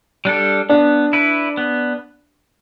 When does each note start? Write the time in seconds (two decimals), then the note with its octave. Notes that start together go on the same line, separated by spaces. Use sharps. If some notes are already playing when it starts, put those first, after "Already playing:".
0.25 G3 D4 A4
0.69 B3 D4
1.13 E4 B4
1.57 B3